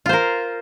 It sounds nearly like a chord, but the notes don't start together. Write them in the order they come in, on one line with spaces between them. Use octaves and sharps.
F4 C5 A#4